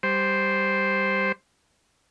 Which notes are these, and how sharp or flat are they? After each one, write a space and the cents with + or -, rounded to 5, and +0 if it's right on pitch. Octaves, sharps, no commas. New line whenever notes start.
G3 +0 C5 +0